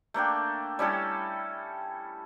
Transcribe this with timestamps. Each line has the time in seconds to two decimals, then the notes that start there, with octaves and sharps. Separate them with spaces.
0.14 A3 A#3 D4 G5
0.79 G3 C#4 E4 A4